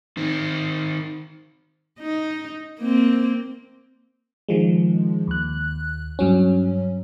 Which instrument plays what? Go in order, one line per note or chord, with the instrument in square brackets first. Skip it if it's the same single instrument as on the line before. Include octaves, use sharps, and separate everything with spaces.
[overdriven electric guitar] D#3 C4
[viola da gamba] D#4
A#3 C4
[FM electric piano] D#3 F3 G#3
D#2 F#6
G2 F#3 C#4